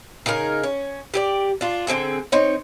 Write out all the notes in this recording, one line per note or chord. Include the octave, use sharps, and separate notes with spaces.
C#3 D#4 G#4 A#4
C#4
G4 G#4 D5
D4 F4
D3 C4 G#4 A4
C4 D#4 C#5